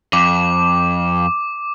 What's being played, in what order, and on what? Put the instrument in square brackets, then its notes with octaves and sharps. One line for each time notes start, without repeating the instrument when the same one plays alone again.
[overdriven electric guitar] F2 [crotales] D6